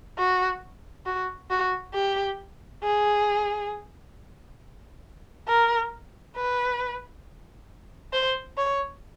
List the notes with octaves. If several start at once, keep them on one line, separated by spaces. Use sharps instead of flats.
F#4
F#4
F#4
G4
G#4
A#4
B4
C5
C#5